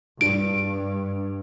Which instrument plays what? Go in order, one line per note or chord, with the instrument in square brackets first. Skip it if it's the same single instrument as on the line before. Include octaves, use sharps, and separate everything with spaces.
[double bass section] G2 [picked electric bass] D4 [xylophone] D7